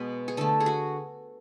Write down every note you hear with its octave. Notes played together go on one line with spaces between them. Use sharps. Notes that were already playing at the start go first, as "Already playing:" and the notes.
Already playing: B2 G#3 B3 B4
G#4
D3 A3 A4
G#4
F#4